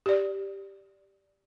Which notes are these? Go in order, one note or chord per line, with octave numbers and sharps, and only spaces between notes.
G4 D5